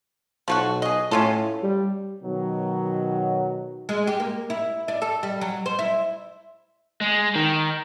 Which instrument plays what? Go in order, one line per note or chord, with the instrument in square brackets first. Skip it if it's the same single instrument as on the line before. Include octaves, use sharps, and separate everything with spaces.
[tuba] B1 [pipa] F3 A3 F#4
[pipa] G#4 D#5
[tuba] A2 [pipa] C#4 F4 A4
[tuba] G3
[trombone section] B2 D#3 F#3
[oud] G#3
G4
A#3
E4
D4
A4
G3
F#3
C5
E4
[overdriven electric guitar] G#3
D#3